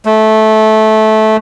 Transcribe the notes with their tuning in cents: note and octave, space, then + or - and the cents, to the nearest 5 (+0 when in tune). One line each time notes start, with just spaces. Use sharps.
A3 -15